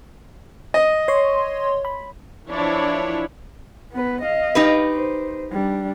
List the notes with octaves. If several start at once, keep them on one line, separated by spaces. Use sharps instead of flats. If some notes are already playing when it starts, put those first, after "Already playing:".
D#5
C#5 C6
B5
E3 F3 D4 E4 C#5 B5
B3 B4
D#5 F5
D#4 G4 B4
C5
G3 D4